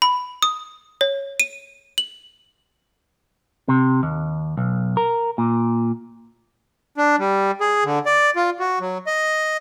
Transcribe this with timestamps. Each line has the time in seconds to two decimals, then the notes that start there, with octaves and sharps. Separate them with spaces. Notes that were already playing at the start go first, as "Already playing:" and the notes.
0.02 B5
0.42 D#6
1.01 C#5
1.40 D#7
1.98 F#7
3.69 C3
4.03 D#2
4.57 B1
4.97 A#4
5.38 A#2
6.97 D4
7.19 G3
7.61 G#4
7.85 D3
8.06 D5
8.36 F4
8.59 F#4
8.80 F#3
9.07 D#5